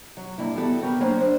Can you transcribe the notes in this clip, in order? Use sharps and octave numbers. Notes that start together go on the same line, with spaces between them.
F#3
G2 A#3 E4
E3 G3 B3 F#4 A4
F#4 G4 A#4 B4
F#3 A#3 C#4 D4 C5
D4 C5